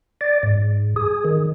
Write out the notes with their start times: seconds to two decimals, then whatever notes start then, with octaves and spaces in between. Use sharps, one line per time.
0.21 D5
0.43 G#2
0.96 G#4
1.25 D#3